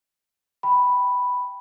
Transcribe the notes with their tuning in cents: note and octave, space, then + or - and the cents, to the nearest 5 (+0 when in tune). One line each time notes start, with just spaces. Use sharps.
G5 +0 B5 +0